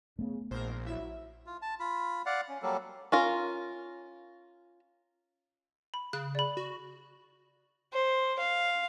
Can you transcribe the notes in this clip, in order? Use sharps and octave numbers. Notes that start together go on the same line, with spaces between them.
C#3 A3 B3
A#1 G#2 A#4 C5
F#3 E4 E5
F4
A5
F4 B5
D5 F5 F#5
C#4
F#3 G3 A#3 A4
C#4 F4 A#4
B5
C#3 F#6
D5 B5
F#4
C5
F5